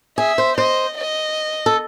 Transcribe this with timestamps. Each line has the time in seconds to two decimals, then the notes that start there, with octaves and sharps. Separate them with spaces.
0.18 G#4 E5
0.38 C5
0.58 C5 D#5
0.97 D#5
1.66 A4